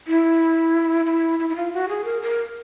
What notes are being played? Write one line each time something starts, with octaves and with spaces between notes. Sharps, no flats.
E4
E4
E4
E4
F4
F#4
G#4
A#4
A#4